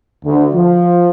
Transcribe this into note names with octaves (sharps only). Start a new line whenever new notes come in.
D2
F3